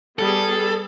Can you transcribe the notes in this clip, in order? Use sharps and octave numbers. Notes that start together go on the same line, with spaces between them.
G3 B3 G#4 A4